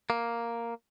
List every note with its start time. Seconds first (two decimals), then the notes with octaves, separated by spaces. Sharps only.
0.10 A#3